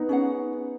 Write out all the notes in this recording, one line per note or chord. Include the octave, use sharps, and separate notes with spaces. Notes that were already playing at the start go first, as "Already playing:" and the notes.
Already playing: B3 D#4
C#4 G#4 C#5 F#5